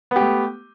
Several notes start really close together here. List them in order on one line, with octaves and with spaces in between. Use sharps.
B3 G4 A3